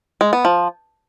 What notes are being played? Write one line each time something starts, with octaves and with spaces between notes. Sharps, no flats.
G#3
B3
F3